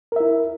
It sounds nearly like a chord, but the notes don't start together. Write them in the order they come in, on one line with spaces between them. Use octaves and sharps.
A#4 E5 E4